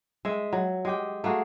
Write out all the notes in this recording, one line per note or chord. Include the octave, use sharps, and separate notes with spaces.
G#3 E5
F#3
G#3 G4 G5
A3 A#3 F#4 G#4